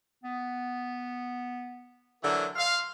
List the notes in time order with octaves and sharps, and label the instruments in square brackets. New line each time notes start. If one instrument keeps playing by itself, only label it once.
[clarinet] B3
[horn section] D3 E3 F#3 [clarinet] A#4
[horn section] F5 [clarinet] C6